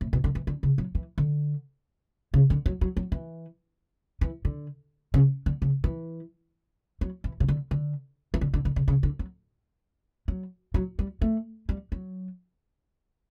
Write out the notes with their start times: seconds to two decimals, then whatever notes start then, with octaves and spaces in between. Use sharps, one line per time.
0.01 A2
0.13 B2
0.24 D3
0.35 E3
0.47 D3
0.63 C#3
0.78 F#3
0.95 E3
1.18 D3
2.34 C#3
2.50 D3
2.66 F#3
2.81 F#3
2.97 F#3
3.12 E3
4.21 E3
4.45 D3
5.14 C#3
5.46 D3
5.62 C#3
5.84 E3
7.01 F#3
7.24 E3
7.40 C#3
7.48 D3
7.71 D3
8.34 E3
8.41 D3
8.54 D3
8.65 D3
8.76 C#3
8.88 C#3
9.03 D3
9.19 F#3
10.28 F#3
10.74 F#3
10.99 G3
11.22 A3
11.69 G3
11.92 F#3